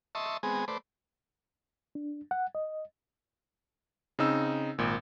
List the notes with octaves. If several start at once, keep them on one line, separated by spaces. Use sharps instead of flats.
D#5 E5 A5 C6 C#6
G#3 B3 C4 G#4
A3 B4 C5 D5
D4
F#5
D#5
C#3 C4 D#4 E6
G#1 A#2